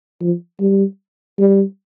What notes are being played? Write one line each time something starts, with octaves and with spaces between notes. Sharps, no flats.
F3
G3
G3